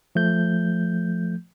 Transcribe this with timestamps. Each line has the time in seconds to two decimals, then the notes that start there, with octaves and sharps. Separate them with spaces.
0.15 F3 A3 G6